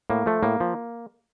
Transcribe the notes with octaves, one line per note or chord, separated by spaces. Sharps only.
A2 A#3
F3 A3
A2 A#3
F3